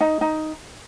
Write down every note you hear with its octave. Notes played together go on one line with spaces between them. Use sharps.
D#4
D#4